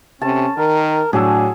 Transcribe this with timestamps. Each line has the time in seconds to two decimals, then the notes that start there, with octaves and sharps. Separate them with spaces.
0.22 C3 C#4 A5
0.57 D#3 A#4
1.13 A2 F#3 D4 F#4 G#4 A5 E6